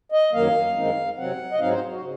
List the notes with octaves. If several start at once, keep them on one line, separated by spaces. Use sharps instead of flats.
D#5
F#2 D#3 F#3 A#3 F5
F#2 D#3 G#3 C4 D#4
C3 F#3 C4 F#5
D#5
G#2 F#3 C4 D#4 F5
C5
F#4
C#3